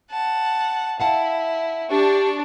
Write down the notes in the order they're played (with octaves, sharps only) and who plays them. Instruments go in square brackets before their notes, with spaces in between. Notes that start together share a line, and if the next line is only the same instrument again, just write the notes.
[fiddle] F#5 A5
[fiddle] E4 [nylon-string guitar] F5 F#5 A5
[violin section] D4 [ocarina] G4 [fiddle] C#6